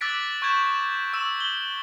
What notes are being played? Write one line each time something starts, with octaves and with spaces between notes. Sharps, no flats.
D6 E6 F#6 A6 B6 D7
C#6 G6 G#6 E7
C#6 E6 E7
G7